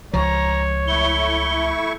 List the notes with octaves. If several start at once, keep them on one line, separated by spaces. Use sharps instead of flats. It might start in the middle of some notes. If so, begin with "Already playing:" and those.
C#2 F3 C#5 A#5
A3 E4 C#6 G7